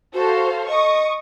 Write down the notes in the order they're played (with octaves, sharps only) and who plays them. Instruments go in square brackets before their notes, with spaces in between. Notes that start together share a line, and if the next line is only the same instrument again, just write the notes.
[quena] F#4 [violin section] A4 C5 F5
[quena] D#5 [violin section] C#6 D#6